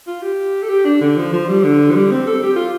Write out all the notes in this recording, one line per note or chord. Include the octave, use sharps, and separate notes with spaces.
F4
G4
A4
G4
D4
D3
F3
F3
G3
D3
F3
G3
C4
A4
G4
F4